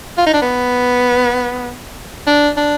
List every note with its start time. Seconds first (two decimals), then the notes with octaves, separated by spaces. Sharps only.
0.18 F4
0.26 D#4
0.34 D4
0.42 B3
2.27 D4
2.57 D4